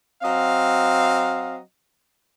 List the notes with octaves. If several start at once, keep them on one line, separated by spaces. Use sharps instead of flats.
F#3 C4 D#5 F5